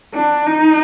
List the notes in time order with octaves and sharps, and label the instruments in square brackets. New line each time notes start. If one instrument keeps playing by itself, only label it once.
[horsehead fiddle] D4
D#4